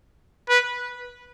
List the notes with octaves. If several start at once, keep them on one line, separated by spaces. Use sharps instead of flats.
B4